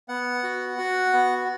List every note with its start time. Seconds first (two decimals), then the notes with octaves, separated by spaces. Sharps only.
0.09 B3 F#5
0.44 F#4
0.78 F#4
1.13 B3